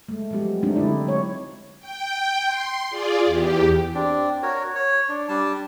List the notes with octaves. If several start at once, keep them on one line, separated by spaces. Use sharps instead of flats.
G#3 A3
F3 F#3 G#3 B3 G4
G#3 A3 C4 D4 D#4
D3 G#3 E4 D5
F#3 C#5
G5
C6
F4 G#4 D5
E2 G4
C4 D4
F#4 A#4 C#5
C#5
D4
G3 D4 A5